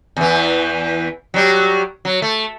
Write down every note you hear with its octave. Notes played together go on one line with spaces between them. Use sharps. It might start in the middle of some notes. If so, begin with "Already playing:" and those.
E2 E3
F#3 G3
F#3
A3